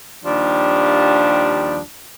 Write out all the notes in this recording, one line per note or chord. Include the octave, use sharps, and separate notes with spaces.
D#2 F3 G3 D4